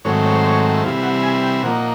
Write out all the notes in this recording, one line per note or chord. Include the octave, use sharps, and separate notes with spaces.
G#2 D#3 F#3 A3 C4 C#5
C#5
C5
C#5
E5
C3 E3 G3 C4 E4 F5
F#5
G#5
G5
A#2 F3 A#3 D#4 F#5